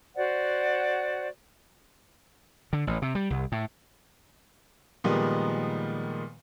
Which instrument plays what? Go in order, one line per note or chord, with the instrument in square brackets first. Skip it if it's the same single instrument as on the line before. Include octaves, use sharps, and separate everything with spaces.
[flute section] F#4 C5 D5 F#5
[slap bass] D3
A1
C3
G3
C2
A2
[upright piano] A#2 D#3 F3 G3 G#3 B3